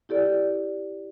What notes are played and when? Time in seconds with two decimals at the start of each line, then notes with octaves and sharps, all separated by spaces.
0.09 E4 G4 A4 D5